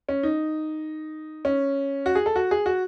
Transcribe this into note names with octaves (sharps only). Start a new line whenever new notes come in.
C#4
D#4
C#4
F#4
G#4
A4
F#4
G#4
F#4